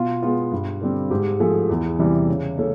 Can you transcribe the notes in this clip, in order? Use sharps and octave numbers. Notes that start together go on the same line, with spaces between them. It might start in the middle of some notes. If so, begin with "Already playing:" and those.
Already playing: B2 F4
G#3 B3 F4
G2
D3 G3 C4
G#2 G4
F3 A3 G#4
E2
C3 E3 G3
C#3
A3 C#4